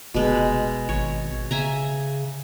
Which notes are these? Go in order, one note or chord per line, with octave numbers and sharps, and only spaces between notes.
F1 B2 G#3
G#1 C#5
C#3 E5 G#5 A#5